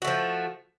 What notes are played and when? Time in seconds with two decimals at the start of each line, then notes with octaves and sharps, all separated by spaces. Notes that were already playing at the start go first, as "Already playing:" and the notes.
0.02 F#4
0.05 A3
0.07 F3